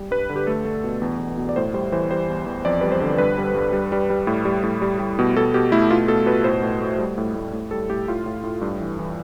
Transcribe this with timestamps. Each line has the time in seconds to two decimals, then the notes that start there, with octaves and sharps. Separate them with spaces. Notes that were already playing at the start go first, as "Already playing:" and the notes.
Already playing: G3
0.11 G2 B4
0.29 D3
0.36 G4
0.47 A3 A4
0.65 A3
0.84 B2
1.02 E2
1.19 E2
1.37 B2
1.49 D5
1.56 A2 C5
1.74 G3 C5
1.92 E3 C5
2.10 G3 C5
2.29 E2
2.46 E2
2.65 F2 D5
2.81 G3 B4
2.92 C5
3.01 D3
3.18 G2 B4
3.38 G3
3.55 G2
3.73 G3
3.92 G3
4.10 G3
4.27 A2
4.45 G3
4.63 A2
4.82 G3
4.99 G3
5.19 B2
5.36 B2 A4
5.54 B2 G4
5.72 A3 E4
5.90 B2 F4
6.08 B2 A4
6.26 B2 B4
6.44 A2 C5
6.63 A2
6.81 A3
6.99 G3
7.18 A2
7.35 A2
7.53 A2
7.71 G3 A4
7.90 A2 G4
8.08 A2 F4
8.26 A2
8.43 A2
8.62 G2
8.81 E3
8.99 E3